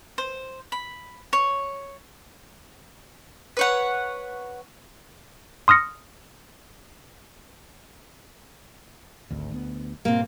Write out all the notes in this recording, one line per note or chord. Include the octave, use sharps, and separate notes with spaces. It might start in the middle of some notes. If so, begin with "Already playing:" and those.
C5
B5
C#5
B4 C#5 F#5
C6 D#6 F6 A#6 C#7
G#1 D2
D2 B3
G#2 B2 G3 A#3 C4